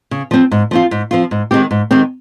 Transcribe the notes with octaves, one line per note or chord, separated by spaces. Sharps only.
C#3
F3 C4
G#2
F3 C4 F4
G#2
F3 C4 F4
G#2
D#3 G#3 C4 G4
G#2
D#3 G#3 C4 G4